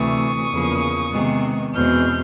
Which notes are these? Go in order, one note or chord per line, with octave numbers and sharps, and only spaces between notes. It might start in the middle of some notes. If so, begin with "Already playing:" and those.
Already playing: D2 C3 E3 A3 C#6 D#6
E2 C#3 F3 A#3
C3 D#3 G#3 B3
E2 B2 G#3 C4 F6 G6